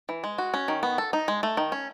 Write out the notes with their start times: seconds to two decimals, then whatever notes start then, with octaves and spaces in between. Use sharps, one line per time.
0.09 E3
0.24 G#3
0.38 F#4
0.54 C#4
0.68 D#3
0.83 B3
0.98 A4
1.13 D#4
1.28 G#3
1.43 A3
1.57 D#3
1.72 C#4